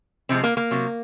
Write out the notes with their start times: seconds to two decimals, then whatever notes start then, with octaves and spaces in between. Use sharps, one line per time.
0.29 C3 F3 G#3 C4
0.43 A#3
0.57 A#3
0.71 C3 F#3